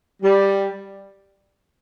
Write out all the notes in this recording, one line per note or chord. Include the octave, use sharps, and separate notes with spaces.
G3